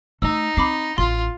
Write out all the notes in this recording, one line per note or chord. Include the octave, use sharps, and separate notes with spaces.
A3 D#4 E6
C4 B5 D6 C7
A1 F4 C6